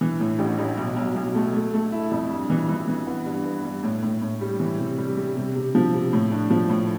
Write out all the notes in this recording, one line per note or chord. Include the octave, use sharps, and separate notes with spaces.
E3
A2
A1
A1
B1
B1
B1
A3
A3
A3
E4
F2
G2
E3
E3
E3
B3
G2
B3
G2
A2
A2
A2
G3
E3
C3
G3
G3
C3
C3
F3
C3
A2
D4
F3
A2